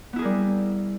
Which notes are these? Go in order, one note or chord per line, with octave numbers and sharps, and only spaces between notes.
G3 B3 E4 G#4 A#4